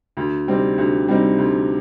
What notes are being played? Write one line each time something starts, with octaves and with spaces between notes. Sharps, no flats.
D2
C3 G3 C4 D#4
D2
C3 G3 C4 D#4
D2